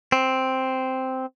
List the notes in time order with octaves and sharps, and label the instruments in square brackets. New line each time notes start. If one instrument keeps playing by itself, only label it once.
[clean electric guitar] C4